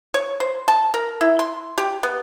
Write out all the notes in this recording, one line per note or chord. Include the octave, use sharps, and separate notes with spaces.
C#5
C5
A5
A#4
E4
C6
G4
B3